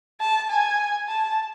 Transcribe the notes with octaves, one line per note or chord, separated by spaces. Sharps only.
A5
G#5
A5